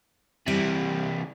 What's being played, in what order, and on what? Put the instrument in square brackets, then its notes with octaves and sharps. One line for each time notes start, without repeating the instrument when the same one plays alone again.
[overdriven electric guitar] C3 E3 [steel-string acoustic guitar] G3